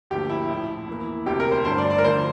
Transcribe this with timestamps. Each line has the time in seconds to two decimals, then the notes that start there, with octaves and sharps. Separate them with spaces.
0.10 D2 D3 F3 A#3 G4
0.30 E4
0.48 A#1 A2 F3
0.87 E2 E3 A#3
1.26 E1 D2 C3 G4
1.40 A#4
1.51 C5
1.65 G1 G2 D3 A3 C5
1.78 D5
1.90 D5
1.98 A#4
2.04 D2 D3 F3 C5